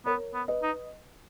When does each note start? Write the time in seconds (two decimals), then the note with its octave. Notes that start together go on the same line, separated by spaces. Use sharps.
0.06 B3 A#4 C#5
0.34 B3
0.48 B4 D#5
0.62 D#4